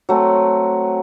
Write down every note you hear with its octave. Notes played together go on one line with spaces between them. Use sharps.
F#3 A3 C4